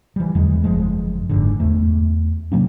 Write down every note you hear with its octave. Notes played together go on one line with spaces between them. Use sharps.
E3 G3
E2 D3 F#3 G#3
F#1 F3 G#3
F#1 G#2 D3
E2 A3
C3 F#3 A#3 C#4